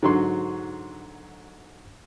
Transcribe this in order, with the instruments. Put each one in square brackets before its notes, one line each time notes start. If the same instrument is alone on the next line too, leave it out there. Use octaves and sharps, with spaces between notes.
[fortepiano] G#2 D3 F#3 F#4 C6